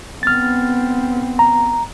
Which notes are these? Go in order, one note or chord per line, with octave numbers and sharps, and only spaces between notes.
B3 C4 F6 A6
A#5